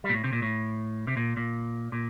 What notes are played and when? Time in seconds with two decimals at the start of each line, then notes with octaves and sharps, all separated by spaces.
0.04 G3
0.09 A#2
0.14 A2
0.24 C3
0.33 A#2
0.42 A2
1.07 C3
1.17 A#2
1.37 A#2
1.92 A#2